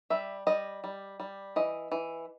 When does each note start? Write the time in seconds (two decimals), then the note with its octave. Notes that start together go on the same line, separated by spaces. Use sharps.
0.10 G3 E5
0.47 G3 D#5
0.84 G3
1.20 G3
1.56 E3 D#5
1.92 E3